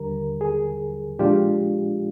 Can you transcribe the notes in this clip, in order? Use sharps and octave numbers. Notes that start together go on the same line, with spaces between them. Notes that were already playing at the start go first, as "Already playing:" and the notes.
Already playing: D#2 D3 G3 A#4
G#4
A#2 F3 G#3 D4 F4 G4